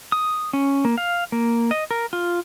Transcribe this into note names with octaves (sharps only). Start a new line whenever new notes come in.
D#6
C#4
A#3
F5
A#3
D#5
A#4
F4